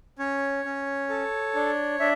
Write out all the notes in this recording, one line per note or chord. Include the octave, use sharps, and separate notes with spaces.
C#4 C#5
C#4
A4
D4
D4 E5